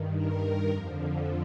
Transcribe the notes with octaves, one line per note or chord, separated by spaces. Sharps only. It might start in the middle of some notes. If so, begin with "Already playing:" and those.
Already playing: G2 D#3
A#4
F2 D3 F3